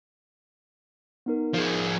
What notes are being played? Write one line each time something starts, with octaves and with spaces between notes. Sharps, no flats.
B3 D#4 A#4
F3 G#4